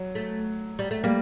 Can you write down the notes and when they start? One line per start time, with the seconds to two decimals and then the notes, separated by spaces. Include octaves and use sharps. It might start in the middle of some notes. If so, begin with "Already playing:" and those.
Already playing: F#3
0.15 A3
0.79 G3
0.91 A3
1.04 G3 A#3